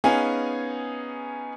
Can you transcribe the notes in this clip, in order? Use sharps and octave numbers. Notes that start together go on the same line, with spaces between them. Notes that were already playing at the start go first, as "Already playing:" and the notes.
B3 C#4 D#4 G#4 F5 G#5